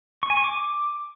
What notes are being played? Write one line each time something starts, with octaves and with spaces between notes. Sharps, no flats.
C#6
G#5
C#6
D6